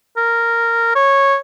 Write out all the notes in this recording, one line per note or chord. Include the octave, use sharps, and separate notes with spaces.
A#4
C#5